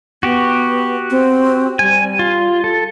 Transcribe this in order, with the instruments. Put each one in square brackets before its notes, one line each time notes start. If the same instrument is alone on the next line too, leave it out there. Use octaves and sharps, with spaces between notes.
[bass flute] B3 [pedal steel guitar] F#4 G4
[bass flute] C4
[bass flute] G3 [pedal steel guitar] G#5
[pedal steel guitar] F4
A4